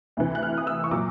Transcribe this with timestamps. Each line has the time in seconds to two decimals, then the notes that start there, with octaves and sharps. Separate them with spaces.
0.17 D2 C3 E3
0.35 F#6
0.43 F6
0.58 D#6
0.67 E6
0.84 C#6
0.91 A#2 F#3 D6